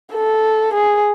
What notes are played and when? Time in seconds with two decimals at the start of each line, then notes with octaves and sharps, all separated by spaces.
0.13 A4
0.74 G#4